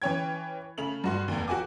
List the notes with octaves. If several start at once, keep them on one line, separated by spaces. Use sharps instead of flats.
E3 C#4 C#5 G5 G#6
C#3 A3 F7 F#7
G2 F#4 C6
F1 D#2
F#4 G4 G#5 D6